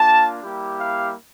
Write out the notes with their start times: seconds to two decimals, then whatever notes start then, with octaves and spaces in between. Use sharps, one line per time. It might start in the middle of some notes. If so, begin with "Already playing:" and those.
Already playing: A#3 D4 F4 A5
0.43 G3 A#3 E4 G4
0.79 F5